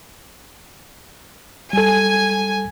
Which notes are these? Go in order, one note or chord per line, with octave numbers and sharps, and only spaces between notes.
G3 A4 G#5